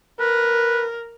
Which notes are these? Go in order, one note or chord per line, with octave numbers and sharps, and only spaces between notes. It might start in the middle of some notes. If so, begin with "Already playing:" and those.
A#4 B4